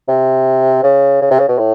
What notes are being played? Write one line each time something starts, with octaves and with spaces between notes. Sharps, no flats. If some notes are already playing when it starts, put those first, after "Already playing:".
C3
C#3
C#3
C3
C#3
B2
A2